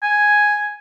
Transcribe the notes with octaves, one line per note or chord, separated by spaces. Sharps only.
G#5